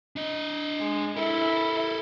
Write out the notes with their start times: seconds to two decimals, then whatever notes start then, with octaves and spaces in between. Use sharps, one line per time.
0.16 D4 D#5
0.80 G#3
1.16 E4 A4 A#4